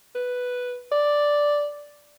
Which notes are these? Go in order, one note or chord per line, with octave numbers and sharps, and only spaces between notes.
B4
D5